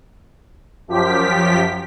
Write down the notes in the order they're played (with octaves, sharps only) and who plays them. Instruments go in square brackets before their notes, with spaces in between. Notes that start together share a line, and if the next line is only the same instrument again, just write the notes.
[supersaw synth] F#2 F3 G4 B6